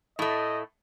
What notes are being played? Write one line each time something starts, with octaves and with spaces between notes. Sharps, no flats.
A2 A3 D#5